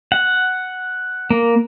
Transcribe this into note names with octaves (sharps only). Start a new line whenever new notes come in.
F#5
A#3